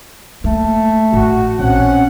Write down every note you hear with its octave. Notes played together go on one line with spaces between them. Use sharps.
A3 A#3
A1 F#4
A#1 C4 C#4 F#5